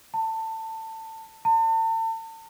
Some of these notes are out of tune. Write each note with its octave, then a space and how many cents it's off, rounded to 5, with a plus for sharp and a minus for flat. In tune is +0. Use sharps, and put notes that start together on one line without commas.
A5 +25
A5 +40